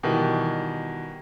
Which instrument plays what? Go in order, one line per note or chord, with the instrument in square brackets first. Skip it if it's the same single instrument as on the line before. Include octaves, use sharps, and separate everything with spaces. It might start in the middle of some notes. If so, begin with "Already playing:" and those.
[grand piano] B2 D#3 E3 G3